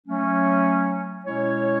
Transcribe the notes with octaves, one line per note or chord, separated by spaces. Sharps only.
F#3 A3 C#4
B2 G#3 C#4 E4 C#5